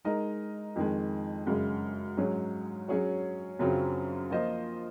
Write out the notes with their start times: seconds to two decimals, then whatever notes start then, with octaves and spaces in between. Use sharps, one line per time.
0.05 G#3 D#4 A#4 D#5
0.76 F2 D#3 G#3
1.47 F#2 C#3 G#3
2.17 G#2 F#3 C#4 G#4
2.88 F#3 C#4 G#4 C#5
3.59 F#2 C#3 F#3 C4 F4
4.30 F3 A#3 F4 C5 D#5